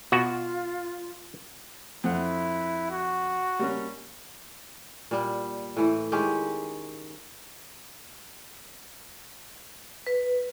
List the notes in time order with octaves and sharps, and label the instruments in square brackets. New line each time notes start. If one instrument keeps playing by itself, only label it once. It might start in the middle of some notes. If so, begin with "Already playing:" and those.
[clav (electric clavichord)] B2 F#4 F#5 [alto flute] F4
[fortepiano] F2 F#5 [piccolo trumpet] E4
[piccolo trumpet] F#4
[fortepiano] G3 A#3 C#4
[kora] A#2 G3
A2 E3
D#3 G#3 C#4 G4
[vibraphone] B4